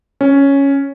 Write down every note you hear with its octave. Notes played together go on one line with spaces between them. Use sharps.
C#4